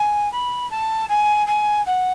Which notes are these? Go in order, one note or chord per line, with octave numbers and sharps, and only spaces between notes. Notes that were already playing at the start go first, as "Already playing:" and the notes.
Already playing: G#5
B5
A5
G#5
G#5
F#5